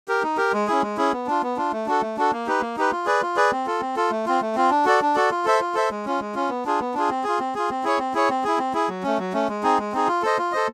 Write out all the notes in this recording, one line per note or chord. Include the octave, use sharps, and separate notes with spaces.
G4 A#4
D#4
G4 A#4
G#3
C#4 E4 G#4
G#3
C#4 E4 G#4
B3
D4 F4
B3
D4 F4
A3
D4 F#4 A4
A3
D4 F#4 A4
A#3
D#4 G4 B4
A#3
D#4 G4 B4
F4
G#4 B4 D5
F4
G#4 B4 D5
C4
F4 A4
C4
F4 A4
A3
C4 F4
A3
C4 F4
D4
F#4 A4 D5
D4
F#4 A4 D5
F4
A4 C5 E5
F4
A4 C5 E5
G#3
C#4 F4
G#3
C#4 F4
B3
D4 F4 G#4
B3
D4 F4 G#4
C4
F4 G#4
C4
F4 G#4
C4
E4 G#4 C#5
C4
E4 G#4 C#5
C4
E4 G#4
C4
E4 G#4
F#3
A3 C#4
F#3
A3 C#4
G#3
C4 D#4 G#4
G#3
C4 D#4 G#4
F4
A4 C5 D#5
F4
A4 C5 D#5